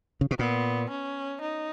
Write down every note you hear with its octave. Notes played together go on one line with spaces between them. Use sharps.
C#3
B2
A#2 B3
C#4
D#4